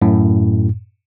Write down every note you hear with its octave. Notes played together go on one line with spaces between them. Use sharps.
F#2 A2